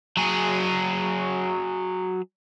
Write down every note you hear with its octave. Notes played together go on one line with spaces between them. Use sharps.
F#3 G#4